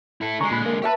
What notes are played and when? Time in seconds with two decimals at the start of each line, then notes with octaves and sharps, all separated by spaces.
0.21 E4 A4
0.40 D3 G#3 G#5 A#5 C#6
0.51 A#2 B5 F#6
0.66 A#3
0.82 G4 B4 C#5 E5 A5